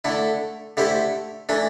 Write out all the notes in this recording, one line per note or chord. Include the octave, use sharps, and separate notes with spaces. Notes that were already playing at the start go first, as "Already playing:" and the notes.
D3 A3 E4
D3 A3 E4 G4 C5
E3 A3 D4